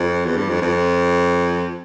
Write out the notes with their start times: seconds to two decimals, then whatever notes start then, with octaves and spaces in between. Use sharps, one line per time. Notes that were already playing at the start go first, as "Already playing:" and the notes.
Already playing: F2
0.26 E2
0.37 G2
0.49 F2
0.62 F2